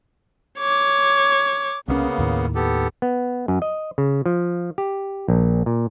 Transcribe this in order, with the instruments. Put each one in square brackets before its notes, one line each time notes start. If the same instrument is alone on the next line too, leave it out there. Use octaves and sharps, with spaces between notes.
[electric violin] C#5 D6
[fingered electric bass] C2 G#3 C#4 [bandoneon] C#3 A#3 B3
[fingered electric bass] D#2 A2 D#3
[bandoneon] B3 G4 A4
[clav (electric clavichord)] B3
F#2
D#5
C#3
F3
G4
A#1
A#2